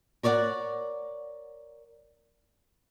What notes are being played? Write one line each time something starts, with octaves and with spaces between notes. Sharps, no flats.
A#4 C#5 D5 E5 F#5